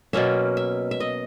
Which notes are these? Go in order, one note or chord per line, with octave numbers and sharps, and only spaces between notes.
B2 F#3 A#3 C#4 E5
E5
E5
D#5